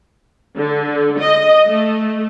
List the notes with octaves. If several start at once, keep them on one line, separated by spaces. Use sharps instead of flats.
D3
D#5
A3